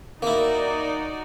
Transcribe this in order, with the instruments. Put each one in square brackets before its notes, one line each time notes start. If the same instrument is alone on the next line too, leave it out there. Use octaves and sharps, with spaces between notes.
[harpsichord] A#3 E4 [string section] D#4 F#4 D5